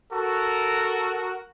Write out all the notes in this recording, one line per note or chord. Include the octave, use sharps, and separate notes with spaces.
F#4 A4 A#4